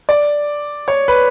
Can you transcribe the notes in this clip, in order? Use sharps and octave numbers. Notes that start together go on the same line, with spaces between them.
D5
C#5
B4